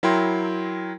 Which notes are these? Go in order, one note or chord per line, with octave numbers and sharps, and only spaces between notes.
F#3 E4 A#4 G5 C6